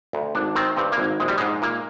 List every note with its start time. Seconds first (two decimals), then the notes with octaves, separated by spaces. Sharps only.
0.13 D2
0.35 G#1 D4
0.55 D#3 C4
0.77 G2 C4
0.92 A#3
0.98 G#1
1.20 A#1 G#3
1.28 G3
1.38 G#2 G#3
1.62 A#2 A#3